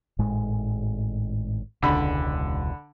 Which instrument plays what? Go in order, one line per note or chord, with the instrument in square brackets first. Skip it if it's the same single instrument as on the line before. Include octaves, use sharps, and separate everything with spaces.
[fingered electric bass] G#1 A2 G#3
[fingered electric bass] E1 C#2 [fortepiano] D3 B5